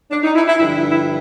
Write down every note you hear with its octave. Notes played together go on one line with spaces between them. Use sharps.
D4
D#4
E4
E4
G2 D3 F3 E4
E4
E4